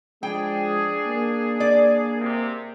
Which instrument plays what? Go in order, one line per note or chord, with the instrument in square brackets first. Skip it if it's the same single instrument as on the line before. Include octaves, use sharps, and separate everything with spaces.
[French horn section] F3 G#3 [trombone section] D4 G#4 [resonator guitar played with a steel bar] G5
[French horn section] A#3
[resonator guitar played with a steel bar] D5
[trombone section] C3